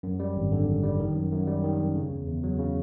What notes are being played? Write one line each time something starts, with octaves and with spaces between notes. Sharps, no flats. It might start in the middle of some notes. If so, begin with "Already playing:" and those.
F#2
G3
G#1
D3
F#2
G3
D#3
F#2
F#2
G3
D#3
F#2
C#3
E2
E2
F#3
C#3